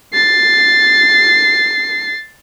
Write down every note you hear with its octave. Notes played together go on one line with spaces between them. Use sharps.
A6 C7